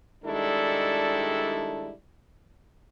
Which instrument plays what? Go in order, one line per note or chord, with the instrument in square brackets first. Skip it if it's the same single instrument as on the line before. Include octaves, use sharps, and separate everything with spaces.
[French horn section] D#3 G3 G#3 D4 E4 A4